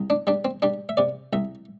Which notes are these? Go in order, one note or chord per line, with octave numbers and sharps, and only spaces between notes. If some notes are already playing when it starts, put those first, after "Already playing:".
Already playing: C2
D4
G3 D4
C4
G3 D4
E5
C3 D5
C2 E5